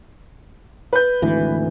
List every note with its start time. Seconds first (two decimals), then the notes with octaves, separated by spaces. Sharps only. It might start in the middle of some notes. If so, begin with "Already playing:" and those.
0.93 B4 G6
1.22 G#1 D2 E3